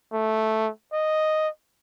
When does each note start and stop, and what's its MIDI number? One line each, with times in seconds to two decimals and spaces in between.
0.13 0.69 57
0.93 1.49 75